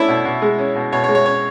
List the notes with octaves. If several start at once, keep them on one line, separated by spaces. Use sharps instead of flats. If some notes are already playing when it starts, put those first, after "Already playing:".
Already playing: A3 C#4 D4 E4
B2
B2
G#3
C#4
B2
B2 C#5
C#5
G#3
C#5
C#4 C#5